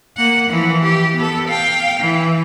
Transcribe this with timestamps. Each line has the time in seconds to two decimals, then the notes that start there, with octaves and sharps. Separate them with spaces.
0.17 A#3 F#5
0.49 E3 F3
0.83 G4
1.16 B3 A4
1.48 F5 G5
2.00 E3